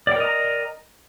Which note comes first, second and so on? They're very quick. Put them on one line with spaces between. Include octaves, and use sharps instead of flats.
D5 G5 A#4 D#5 A#5